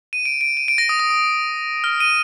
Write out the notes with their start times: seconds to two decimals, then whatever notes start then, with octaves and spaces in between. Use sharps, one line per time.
0.13 D#7
0.25 D7
0.41 D7
0.57 D#7
0.68 D7
0.78 A#6
0.89 D#6
1.00 D#6
1.10 D#6
1.84 F6
2.00 D#7